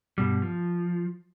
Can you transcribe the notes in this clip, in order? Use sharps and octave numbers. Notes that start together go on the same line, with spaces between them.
G2 B2 G3
F3